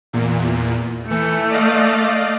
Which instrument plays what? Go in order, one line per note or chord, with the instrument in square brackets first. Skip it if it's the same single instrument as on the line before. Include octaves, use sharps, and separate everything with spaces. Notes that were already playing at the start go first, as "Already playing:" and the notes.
[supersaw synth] E2 A#2
[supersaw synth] E3 C#7 [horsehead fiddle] A3
[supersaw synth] D5 D#5 F5